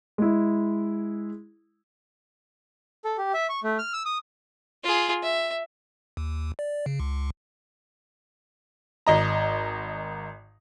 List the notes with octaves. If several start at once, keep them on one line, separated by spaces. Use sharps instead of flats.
G#3 E4
A4
G4
E5
C#6
A3
F6
E6
D#6
F4 G#4
E5
D#2
D5
C#3
C#2
G#1 D#5 A#5